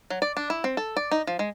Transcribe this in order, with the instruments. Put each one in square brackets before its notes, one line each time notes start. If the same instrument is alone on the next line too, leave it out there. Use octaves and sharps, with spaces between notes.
[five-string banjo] F#3
D5
D4
E4
C4
A4
D5
D#4
F3
G#3